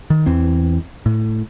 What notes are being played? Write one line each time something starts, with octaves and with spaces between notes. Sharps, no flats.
D#3
E2 E3 C4
A2